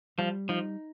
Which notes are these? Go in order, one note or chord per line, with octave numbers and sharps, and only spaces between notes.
F3 G3
F3 D#4